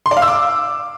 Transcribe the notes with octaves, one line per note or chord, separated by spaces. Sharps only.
C6
D5
F5
E6
D6